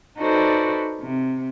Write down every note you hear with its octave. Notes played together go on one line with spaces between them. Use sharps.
D#4 F#4 A4 B4 C5 D5
C3